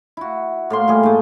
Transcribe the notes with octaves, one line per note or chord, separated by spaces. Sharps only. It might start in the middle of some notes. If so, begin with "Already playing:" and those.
E4 F#4
A2 A#3 C6
A#2 G3 G#4
G#2 A3